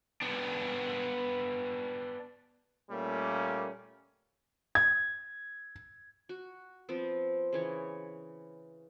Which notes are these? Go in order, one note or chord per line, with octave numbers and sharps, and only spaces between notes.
B3 D4
A#2 G3 A3 A#3 C#4
G#6
F#4
F3 B3 C4
C#3 E3 C#5